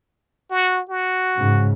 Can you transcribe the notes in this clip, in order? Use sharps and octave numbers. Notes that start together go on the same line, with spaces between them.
F#4
F#4
G#2 C#3